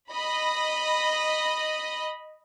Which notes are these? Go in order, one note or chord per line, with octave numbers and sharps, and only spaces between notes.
D#5 B5